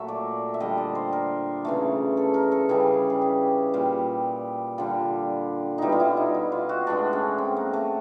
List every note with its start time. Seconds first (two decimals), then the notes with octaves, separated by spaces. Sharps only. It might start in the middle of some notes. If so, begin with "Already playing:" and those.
Already playing: A#2 F#3 A3 E5
0.08 D5
0.54 E5
0.60 D3 G3 D#5
0.78 D5
0.95 C5
1.12 A#4
1.65 C#3 E3 A3
2.17 A4
2.34 A#4
2.52 A4
2.69 C#3 E3 G3 G#4
3.10 G#4
3.22 G4
3.74 A#2 G3
4.78 D3 G3 F4
5.78 B2 G3 D#4 E4
5.92 F4
6.00 E4
6.17 D#4
6.34 E4
6.52 F4
6.69 F#4
6.87 A2 E3 G#3 D4
7.13 C#4
7.38 C4
7.57 A#3
7.73 A3